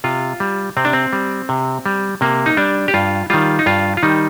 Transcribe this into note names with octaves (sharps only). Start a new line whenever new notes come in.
C3 F4
G3
C3 C4
D4
C4
G3
C3
G3
C3 A#3
D#4
G3 D4
G4
G2 F4
D#3 G3 F4
D#4
G2 F4
F4
D#3 G3 D#4